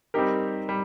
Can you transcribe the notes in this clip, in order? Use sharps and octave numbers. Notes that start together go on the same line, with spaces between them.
G3 C4 D#4 G4 A#4
G3